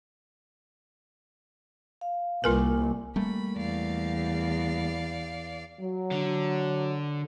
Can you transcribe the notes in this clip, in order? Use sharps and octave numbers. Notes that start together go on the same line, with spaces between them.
F5
C2 A#3 F4 A#4 B4 G#5
G3 A3 A#3 B5
E2 D5 F5
F#3
D3